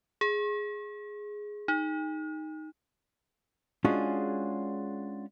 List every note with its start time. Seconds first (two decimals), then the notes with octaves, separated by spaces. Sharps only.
0.21 G#4
1.68 D#4
3.84 G#3 C#4 D4 F4 F#4 G#4